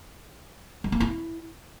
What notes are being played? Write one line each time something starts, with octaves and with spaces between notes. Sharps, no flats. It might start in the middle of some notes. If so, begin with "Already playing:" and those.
G#3
A#3
E4